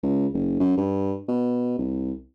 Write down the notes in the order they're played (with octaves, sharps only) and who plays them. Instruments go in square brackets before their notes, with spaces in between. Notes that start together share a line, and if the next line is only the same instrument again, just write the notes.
[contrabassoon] C#2
F#1
F#2
G2
B2
C2